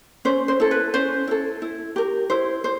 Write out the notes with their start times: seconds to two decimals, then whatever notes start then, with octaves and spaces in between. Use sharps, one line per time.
0.25 C#4 C5
0.48 C5
0.60 E4 A4
0.71 B4
0.94 C#4 C5
1.28 E4 A4
1.62 E4
1.96 G4 A#4
2.30 E4 C5
2.64 C5